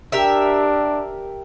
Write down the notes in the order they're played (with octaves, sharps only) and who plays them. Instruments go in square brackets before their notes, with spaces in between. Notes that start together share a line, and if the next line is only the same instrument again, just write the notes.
[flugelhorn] D4 [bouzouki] G4 A#4 E5